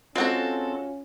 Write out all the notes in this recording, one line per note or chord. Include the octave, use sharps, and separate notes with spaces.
G#3 C4 C#4 F4 F#4 A4